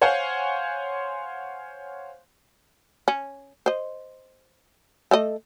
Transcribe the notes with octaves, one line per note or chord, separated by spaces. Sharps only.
C5 C#5 F5 F#5 G#5 C6
C#4
C5 D#5
A3 A4 D#5